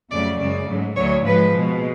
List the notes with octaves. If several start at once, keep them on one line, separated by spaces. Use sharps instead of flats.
F2 C#3 F#3 A3 D5
F#2 C#3 G#3 D5
G#2 F#3 A3
D2 D3 F#3 A3 C#5
G#2 F3 G#3 B4
B2 G#3